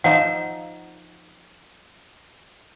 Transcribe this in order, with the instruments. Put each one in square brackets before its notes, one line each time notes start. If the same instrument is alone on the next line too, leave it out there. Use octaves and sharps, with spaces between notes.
[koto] F3 D#4 E5 [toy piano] F#5